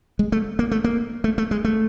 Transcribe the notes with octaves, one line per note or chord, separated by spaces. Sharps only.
G#3
A3
A#3
A3
A#3
A3
A3
G#3
A3